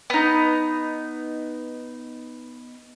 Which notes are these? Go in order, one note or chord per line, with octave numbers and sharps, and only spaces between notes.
B3 D#4